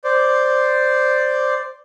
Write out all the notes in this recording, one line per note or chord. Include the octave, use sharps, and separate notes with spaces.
C5 D5